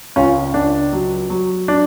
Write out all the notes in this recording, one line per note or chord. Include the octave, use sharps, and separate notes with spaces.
C#2 C#4 F4
C#2 D4
F#3
F#3
D4